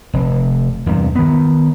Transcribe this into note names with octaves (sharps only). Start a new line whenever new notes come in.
F1
E2 G2 C3
D#3 B3